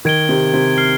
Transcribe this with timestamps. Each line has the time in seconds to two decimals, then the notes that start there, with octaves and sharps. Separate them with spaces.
0.05 D#3 G#6 D7 G7
0.29 C3
0.54 C3
0.78 F6 C7 G7